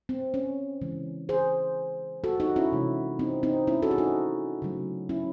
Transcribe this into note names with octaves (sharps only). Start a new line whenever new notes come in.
C4
C#4
C#3 E3 G#3
G#4 C5
F#4 A4
D#4 F#4
C#4 E4
C3 E3 G#3
C4 D#4
C4 D#4
C#4 E4
F#4 A4
G#4
D#4 F#4
C#3 F#3 A3
C#4 E4